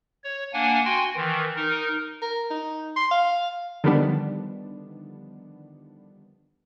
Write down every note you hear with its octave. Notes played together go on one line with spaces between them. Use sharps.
C#5
A#3 D4 F#5 G#5
F#4 G5 G#5 C6
D#3 E3
D#4 A#4
A#4
D#4
C6
F5
D3 D#3 F3 G3 B3 D4